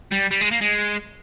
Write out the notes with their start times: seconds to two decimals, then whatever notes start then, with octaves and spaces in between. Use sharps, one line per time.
0.12 G3
0.31 G3
0.41 G#3
0.51 A#3
0.61 G#3